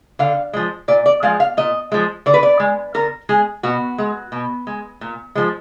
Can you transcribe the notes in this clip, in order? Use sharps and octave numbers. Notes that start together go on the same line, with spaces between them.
D3 F5
F3 G#3
A#2 D5
D5
F3 G#3 F5
F5
A#2 D#5
F3 G#3
D3 D5
B4
D5
G#3
D3 A#4
G#3 G#4
B2 F#4
G#3
B2
G#3
A#2
F3 G#3